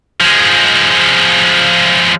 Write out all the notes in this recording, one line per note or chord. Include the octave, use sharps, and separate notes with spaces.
F3 G#3